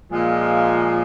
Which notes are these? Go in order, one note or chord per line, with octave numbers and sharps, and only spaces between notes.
A#2 F3 G#3